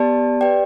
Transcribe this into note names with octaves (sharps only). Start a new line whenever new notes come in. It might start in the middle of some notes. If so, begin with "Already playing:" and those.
Already playing: B3 G4 D5 A5
G4 B4 D5 G5